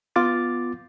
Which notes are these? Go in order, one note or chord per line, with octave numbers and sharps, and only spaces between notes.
B3 F4 D6 A6